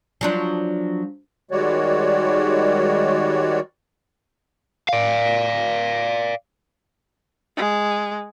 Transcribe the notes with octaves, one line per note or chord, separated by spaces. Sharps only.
F3 F#3 D4
D#3 G3 G#3 F#4 C#5 D5
D5 F5
G#3